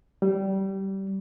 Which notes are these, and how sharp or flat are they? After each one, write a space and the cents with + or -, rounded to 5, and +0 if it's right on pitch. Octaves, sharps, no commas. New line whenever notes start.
G3 -20